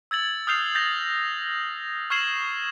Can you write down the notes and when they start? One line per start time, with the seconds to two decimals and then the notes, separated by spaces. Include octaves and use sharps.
0.11 E6 G#6 A6 F#7
0.47 D#6 F6 G6 C7 F7
0.75 G6 A6 A#6 F7
2.10 C#6 F6 G#6 C7 E7 F#7